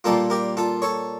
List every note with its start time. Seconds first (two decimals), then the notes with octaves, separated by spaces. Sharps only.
0.04 A#2 G3 A#3 F4 A4
0.30 G4 A#4
0.57 F4 A4
0.82 A4 C#5